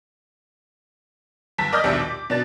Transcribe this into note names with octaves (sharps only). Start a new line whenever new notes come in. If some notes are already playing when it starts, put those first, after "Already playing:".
G1 A5 B6
D5 D#5 D6 D#6 F6 G6
A#1 D#2 B2 G3 D4 E5
D6
B2 D4 A6